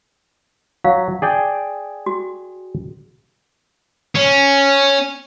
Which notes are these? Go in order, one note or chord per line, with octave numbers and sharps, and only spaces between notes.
F#3 F5
G#4 D5 G5
F#4
C#4